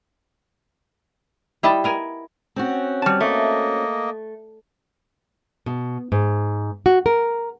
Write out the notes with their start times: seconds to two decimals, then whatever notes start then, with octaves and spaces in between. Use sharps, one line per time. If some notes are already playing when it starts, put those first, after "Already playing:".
1.63 G3 E4 D#5 A5
1.84 B3 A#4 G#5
2.56 C4 C#4 F#4
3.02 G3 A5
3.20 A3 A#3 D#5
5.66 B2
6.12 G#2
6.86 F#4
7.06 A#4